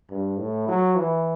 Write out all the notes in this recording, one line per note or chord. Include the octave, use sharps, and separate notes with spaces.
G2
A2
F#3
E3